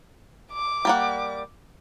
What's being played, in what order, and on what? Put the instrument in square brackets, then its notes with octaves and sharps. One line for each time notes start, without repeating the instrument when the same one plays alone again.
[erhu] D6
[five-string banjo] G3 A#3 F#5